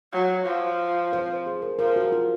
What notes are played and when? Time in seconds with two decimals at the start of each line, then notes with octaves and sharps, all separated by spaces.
0.13 F#3
0.46 F3
1.13 C5
1.46 G#4
1.62 A#4
1.79 F3 A#4
1.96 F#4
2.12 F4